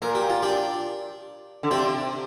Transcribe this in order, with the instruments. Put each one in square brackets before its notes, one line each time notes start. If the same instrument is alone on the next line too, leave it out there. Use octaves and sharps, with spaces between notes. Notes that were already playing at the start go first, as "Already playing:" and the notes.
[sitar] A#2 [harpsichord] A#4
[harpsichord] G4
F4
D4 G4
[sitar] D3
[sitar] C3 [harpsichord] D4 G4